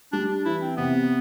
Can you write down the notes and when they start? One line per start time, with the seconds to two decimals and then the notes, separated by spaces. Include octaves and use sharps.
0.13 G3 D4
0.30 D4
0.45 E3 E4
0.62 C4
0.77 C3 B3